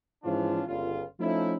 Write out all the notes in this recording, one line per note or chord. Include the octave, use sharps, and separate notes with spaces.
G#2 E3 F3 C#4 D4 F4
G1 C#2 F4
F3 A3 C#4 D#4 E4